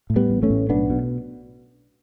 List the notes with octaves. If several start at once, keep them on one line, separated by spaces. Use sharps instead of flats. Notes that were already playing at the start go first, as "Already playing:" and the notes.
A2
G3 B3
A1
A3 C#4
A2
B1 B3 D4
B2